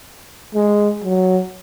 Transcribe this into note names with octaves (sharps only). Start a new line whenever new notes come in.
G#3
F#3